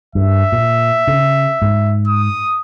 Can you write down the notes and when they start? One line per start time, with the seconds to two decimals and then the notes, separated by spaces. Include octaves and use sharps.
0.15 G2 E5
0.52 A#2
1.07 C#3
1.62 G#2
2.07 D#6